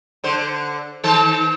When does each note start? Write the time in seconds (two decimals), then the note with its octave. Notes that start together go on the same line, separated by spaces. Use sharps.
0.24 D3 C5
1.04 D#3 A4 C5